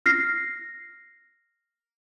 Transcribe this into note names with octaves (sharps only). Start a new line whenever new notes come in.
F6 A#6 C7